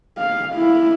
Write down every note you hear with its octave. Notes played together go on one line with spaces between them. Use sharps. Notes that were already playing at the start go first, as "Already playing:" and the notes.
F5
E4